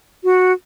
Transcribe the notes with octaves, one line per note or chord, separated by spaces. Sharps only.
F#4